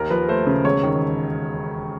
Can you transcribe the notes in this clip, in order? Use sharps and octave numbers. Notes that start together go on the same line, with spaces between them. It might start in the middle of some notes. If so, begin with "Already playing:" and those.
Already playing: D#2 D#3 A#4
F3 B4
A3 C5
C#3
E1 C#5
D#3